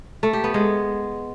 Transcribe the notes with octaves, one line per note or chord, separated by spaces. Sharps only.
A3
G4
B3
G#3